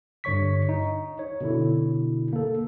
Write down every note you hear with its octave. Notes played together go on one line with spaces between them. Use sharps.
G2 D3 C#5 C#6 B6
D#4
C#5
B2 D3 E4
A#3 A4